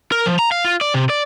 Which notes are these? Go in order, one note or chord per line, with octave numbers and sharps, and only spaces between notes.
A#4
F3
A#5
F5
F4
D5
C3
D5